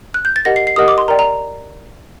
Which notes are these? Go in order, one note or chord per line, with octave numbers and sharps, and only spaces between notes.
F#6
G6
A6
G4 A#4 D#5 F#5 A#6
C7
C7
G4 A#4 D#5 F#5 D#6
D6
C6
A#4 D5 G5 A#5
A#5